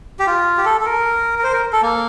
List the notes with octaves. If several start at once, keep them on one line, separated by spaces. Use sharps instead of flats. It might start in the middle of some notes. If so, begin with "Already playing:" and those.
G4
F4
G4
A4
A4
A#4
A#4
C5
A#4
A4
A#3